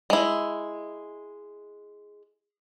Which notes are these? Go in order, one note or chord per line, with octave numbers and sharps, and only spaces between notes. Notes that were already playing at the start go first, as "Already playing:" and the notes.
G#3 E4